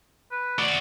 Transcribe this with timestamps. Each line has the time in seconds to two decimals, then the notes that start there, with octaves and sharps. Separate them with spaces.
0.31 B4
0.59 F#4 D5